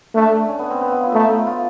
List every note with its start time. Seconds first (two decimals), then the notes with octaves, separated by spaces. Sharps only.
0.15 A3 D4
0.48 C#4
0.59 B3
0.70 C4
0.81 B3
0.92 F4
1.03 E4
1.14 A3 D#4
1.30 E4
1.47 F4